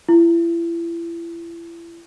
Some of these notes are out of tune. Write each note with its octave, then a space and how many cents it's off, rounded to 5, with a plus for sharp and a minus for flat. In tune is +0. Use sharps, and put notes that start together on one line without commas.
E4 +35